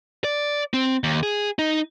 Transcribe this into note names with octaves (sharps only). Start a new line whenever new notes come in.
D5
C4
D#2
G#4
D#4